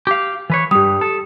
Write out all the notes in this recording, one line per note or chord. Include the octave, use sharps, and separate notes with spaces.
G4 F5
E3 B4 C#5
G2 G3 G4 D#6
A4